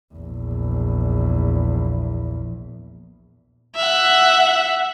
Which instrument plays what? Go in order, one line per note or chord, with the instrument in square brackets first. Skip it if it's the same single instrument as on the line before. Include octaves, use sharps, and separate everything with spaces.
[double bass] A#1 E2
[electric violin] E5 F#5